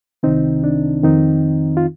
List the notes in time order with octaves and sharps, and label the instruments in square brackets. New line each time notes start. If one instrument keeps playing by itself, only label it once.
[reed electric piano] C2 C3 D#3 C4 D#4
D4
F2 D#3 C4 D#4
F4